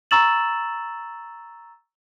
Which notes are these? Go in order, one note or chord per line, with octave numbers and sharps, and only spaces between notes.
A#5 C#6 E6 A6 E7 F#7